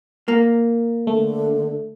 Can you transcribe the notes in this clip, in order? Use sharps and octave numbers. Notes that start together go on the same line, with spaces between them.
A#3
D3 A3